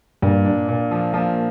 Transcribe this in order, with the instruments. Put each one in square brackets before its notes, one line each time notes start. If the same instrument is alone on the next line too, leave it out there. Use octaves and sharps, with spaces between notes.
[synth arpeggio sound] G2 G3 [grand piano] A#2
[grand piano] D4
A#2
F3
[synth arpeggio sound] A#2 A#3 [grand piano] F3